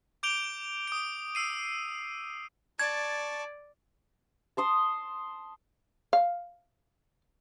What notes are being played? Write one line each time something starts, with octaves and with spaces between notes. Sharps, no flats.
D6 G6 D7 F7 G7
D#6 D7
E6 C7 D#7
D5 A5 C#6 G#6
A5 C6 D#6
F5